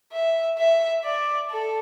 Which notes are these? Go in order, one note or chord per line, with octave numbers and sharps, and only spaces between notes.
E5
E5
D5
A4